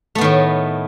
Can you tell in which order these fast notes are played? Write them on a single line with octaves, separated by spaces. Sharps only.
A3 B3 D#3 A2